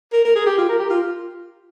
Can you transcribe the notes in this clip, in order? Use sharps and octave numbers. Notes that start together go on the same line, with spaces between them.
A#4
A#4
G#4
G4
F4
A#4
G4
F4